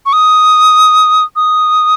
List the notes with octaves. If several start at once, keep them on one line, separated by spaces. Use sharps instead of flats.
C#6
D#6
D#6